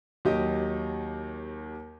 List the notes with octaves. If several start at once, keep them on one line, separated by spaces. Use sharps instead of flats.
D#2 F#3 G4 D#5